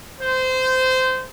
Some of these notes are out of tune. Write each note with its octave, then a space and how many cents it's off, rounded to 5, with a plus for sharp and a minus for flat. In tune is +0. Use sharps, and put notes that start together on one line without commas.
C5 -20